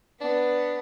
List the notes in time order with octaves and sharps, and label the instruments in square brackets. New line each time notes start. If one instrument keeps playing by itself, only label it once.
[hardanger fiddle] B3 [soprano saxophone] D4